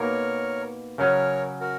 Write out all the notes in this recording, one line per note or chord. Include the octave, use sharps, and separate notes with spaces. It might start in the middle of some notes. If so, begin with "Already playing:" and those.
Already playing: B2 A#3 D#4 A#4 C#5
C#3 F#3 C#4 A#4 C#5
F#4 A#4